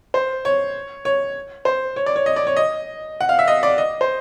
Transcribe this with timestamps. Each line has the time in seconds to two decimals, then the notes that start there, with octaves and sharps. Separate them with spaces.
0.14 C5
0.45 C#5
1.05 C#5
1.65 C5
1.96 C#5
2.06 D5
2.16 C#5
2.26 D#5
2.36 D5
2.47 C#5
2.57 D#5
3.21 F#5
3.29 F5
3.39 E5
3.48 D#5
3.63 D5
3.78 D#5
4.01 C5